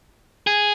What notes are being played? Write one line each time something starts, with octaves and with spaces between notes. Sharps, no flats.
G#4